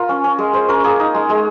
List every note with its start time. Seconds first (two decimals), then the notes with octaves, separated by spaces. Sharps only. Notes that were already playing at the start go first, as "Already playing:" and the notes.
Already playing: F4 A#4
0.09 C#4
0.24 C#4
0.38 G#3
0.53 G#3 C5
0.68 C#4 A#4
0.84 A#3 G#4
0.99 D#4
1.14 G#3
1.29 G#3